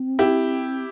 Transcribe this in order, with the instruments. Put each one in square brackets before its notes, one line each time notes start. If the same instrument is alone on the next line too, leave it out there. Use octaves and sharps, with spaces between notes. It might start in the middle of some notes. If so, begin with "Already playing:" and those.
Already playing: [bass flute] C4
[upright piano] E4 G4